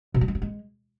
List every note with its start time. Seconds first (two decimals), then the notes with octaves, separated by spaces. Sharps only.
0.14 B2
0.21 G3
0.28 G#3
0.35 F#3
0.42 G#3